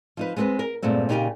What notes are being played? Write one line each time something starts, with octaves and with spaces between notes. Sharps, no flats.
F3 D#4 B4
G#3 B3 C4 A#4 B4
A#4
G2 A#2 G#3 A3 C4
A#2 C#3 D#4 G4 C#5 G#5